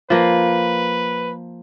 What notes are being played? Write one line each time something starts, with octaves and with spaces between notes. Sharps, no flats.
F3 A#3 B4